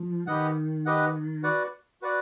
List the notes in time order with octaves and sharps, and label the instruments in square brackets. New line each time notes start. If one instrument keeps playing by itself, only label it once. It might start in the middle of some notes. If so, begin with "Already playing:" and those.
Already playing: [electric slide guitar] F3
[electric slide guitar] D#3 [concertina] G4 B4 D#5 F#5
[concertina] G4 B4 D#5 F#5
F#4 B4 D5 F#5
F#4 B4 D5 F#5